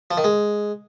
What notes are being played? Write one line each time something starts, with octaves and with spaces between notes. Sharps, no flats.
F3
D#3
G#3